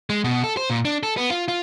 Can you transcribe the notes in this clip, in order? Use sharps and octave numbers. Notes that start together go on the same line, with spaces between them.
G#3
B2
A4
C5
A#2
D4
A4
B3
F4
F4